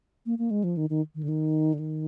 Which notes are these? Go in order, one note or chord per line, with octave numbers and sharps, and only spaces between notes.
A#3
A#3
G#3
F3
D#3
D#3
D#3
D3
D#3
D3
D#3